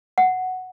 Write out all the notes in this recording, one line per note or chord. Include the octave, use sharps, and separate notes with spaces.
F#5